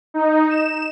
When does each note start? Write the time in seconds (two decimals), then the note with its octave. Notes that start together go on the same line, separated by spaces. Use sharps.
0.14 D#4
0.50 E7